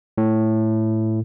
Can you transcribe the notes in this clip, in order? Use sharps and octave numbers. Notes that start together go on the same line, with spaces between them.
A2